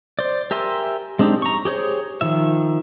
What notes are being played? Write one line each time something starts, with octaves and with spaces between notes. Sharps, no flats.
C5 D5
G4 A#4 E5 G#5 C6
G#3 C4 D4 D#4 G4
A#5 C#6
G4 G#4 C5 C#5
D#3 F3 E5